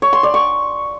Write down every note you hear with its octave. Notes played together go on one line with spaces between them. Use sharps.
C#5
C6
D5
C#6